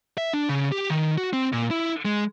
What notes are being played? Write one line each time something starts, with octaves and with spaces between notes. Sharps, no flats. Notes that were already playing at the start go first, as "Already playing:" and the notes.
E5
D4
C#3
G4
D#3
F#4
C4
A#2
E4
G#3